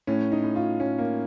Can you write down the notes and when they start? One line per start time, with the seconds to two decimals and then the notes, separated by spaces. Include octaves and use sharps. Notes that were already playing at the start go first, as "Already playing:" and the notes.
0.07 A2 C#4
0.32 D#4
0.44 A2
0.56 F4
0.80 A2 C#4
0.99 A#3